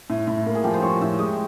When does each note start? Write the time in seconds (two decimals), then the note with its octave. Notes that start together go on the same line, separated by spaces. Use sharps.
0.10 A2
0.27 A2
0.46 A#3
0.55 G#4
0.64 F3 G4
0.74 C5
0.82 F3 C#5
1.01 A2 E5
1.19 G#3 D#5